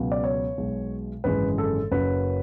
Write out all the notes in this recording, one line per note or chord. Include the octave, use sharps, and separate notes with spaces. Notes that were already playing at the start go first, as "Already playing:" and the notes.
Already playing: C#2 B2 F#3
D5
C#5
B1 B2 G#3
G#1 F#2 C#3 E3 G#3 B4
A4
F#1 F#2 C#3 F#3 B4